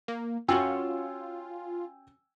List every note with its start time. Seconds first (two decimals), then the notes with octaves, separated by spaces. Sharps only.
0.08 A#3
0.48 C#4 F4 F#4 C#5 G5 G#5 E6